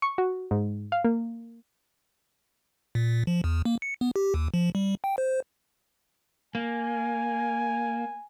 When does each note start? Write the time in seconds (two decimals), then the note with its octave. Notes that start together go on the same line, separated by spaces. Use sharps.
0.02 C#6
0.18 F#4
0.51 G#2
0.92 F5
1.04 A#3
2.95 A#2
3.27 F3
3.44 E2
3.65 A#3
3.82 C#7
4.01 B3
4.16 G4
4.34 D#2
4.54 F3
4.75 G3
5.04 G5
5.18 C5
6.55 A#3 G#5